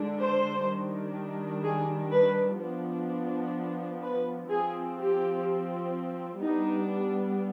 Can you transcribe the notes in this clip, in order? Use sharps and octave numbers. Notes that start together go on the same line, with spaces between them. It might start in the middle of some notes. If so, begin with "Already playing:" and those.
Already playing: D3 G#3 D4
C5
D#3 G3 D4
G#4
B4
F3 B3 D4
B4
F3 C4 G#4
G4
G3 B3 D4 D#4